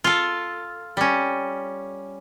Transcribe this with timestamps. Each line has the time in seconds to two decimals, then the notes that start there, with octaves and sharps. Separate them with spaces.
0.04 F4 A4
0.97 G3 C#4